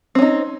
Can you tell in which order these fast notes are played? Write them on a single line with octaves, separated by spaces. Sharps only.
C4 C#4 D#4